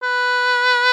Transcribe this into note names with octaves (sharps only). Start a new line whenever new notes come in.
B4